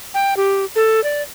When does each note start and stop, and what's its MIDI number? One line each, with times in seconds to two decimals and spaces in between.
0.14 0.34 79
0.37 0.65 67
0.76 1.03 69
1.04 1.22 74